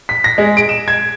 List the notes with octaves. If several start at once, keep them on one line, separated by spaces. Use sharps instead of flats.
B6
A#6
G#3
D7
E7
G#6